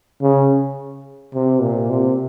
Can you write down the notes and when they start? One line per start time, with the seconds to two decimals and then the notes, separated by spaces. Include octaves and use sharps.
0.22 C#3
1.34 C3
1.61 A#2
1.90 C3